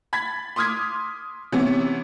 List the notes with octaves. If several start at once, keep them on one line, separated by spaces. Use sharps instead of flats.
B5 G#6 A6 B6
C6 D6 D#6 F6 G#6 B6
C3 E3 B3 C#4